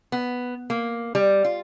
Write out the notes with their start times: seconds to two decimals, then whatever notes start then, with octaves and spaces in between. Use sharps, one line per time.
0.12 B3
0.70 A#3
1.15 G3
1.45 F4